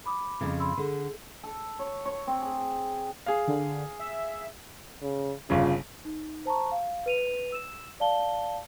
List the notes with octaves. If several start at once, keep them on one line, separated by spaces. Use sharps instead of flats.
B5 D6 D#6
F2 G#2 C#3
B5 C6 E6
D3 G#4
A4
C#5
C#5
C4
G#4
G#4 F5
D3
E5
C#3
G1 C#3 F4
D#4
C5 A5 A#5 C#6
F5
B4 D#7 F7
E6 E7
D5 F5 A5 G7